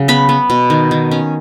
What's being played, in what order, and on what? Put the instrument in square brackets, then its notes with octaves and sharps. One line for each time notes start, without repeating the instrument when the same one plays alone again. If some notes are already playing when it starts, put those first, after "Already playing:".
Already playing: [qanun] C#3 F#3
B3 B5
B3
B2
D#3
D#3
C#4